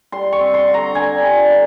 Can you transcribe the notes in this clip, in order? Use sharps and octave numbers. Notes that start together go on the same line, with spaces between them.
G3 C6
C#6
C4
C6
D3
A#5
D3 G#5
G3
D3